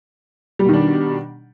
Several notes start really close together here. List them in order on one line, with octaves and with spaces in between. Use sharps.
G3 B2 D#3 D4